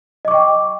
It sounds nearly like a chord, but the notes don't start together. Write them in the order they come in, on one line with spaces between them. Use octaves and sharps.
D#5 D6 C#6 G5